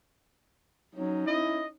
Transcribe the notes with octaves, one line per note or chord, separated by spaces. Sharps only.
F#3 C#4 D#4
E4 D#5